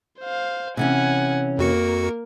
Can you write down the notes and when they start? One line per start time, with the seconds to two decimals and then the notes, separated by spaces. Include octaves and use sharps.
0.20 C5 F5
0.77 C3 E3 C#4 F#5 G#5
1.59 F2 A#3 F#4 A#4 C#7